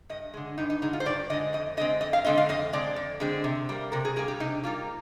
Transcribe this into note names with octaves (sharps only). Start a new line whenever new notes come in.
G2 D#5
D3 G#3
G2 D#4
D#4
D3 G#3 D#4
F4
C5
G2 D5
D3 G#3 D#5
F2 D#5
D3 G#3 C4 D#5
F2 D#5
F5
D3 G#3 C4 D#5
F5
F2 D#5
D3 G#3 C4 D5
F2
D3 G#3 C4
C3
G3 A#3
C3 A#4
G#4
G3 A#3 G#4
G4
C3 D#4
G3 A#3 F4